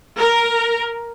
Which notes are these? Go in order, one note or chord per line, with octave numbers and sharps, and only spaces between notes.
A#4